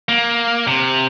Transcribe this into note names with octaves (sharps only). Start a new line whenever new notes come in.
A#3
C3